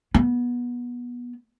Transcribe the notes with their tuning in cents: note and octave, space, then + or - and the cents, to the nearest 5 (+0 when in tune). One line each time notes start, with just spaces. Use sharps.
B3 -20